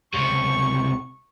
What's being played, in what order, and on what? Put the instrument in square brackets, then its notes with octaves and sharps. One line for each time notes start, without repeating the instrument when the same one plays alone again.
[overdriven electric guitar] C#2 C3 [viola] C#6